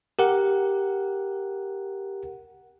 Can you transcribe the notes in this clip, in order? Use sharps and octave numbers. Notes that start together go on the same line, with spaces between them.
G4 A#4 F#5